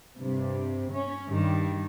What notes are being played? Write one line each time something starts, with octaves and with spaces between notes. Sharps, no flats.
G2 C3
C#4
G2 D#3 G3